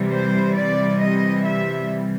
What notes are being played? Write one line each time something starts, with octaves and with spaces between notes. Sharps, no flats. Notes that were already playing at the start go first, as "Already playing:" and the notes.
Already playing: C3 E3 G3
C5
D5
D#5
E5